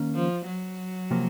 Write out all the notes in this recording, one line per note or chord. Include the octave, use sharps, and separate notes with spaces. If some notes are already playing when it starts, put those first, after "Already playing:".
Already playing: D#3 A#3 C#4
F3
F#3
C3 F3 A#3